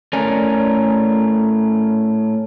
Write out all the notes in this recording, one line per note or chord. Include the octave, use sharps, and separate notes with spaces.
A2 A3 C#4 A#4 D5 G#5